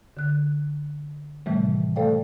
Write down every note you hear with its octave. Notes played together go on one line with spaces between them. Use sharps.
D3 F#6
A2 C3 D#3 E3 G3 A3
A3 A4 C5 D5 F5 G5